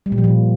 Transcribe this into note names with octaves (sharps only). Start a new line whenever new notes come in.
G3
A#2
F3
A#2